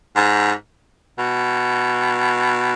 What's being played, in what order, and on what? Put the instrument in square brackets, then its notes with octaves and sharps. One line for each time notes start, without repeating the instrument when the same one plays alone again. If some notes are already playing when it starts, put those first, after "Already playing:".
[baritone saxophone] G#2
B2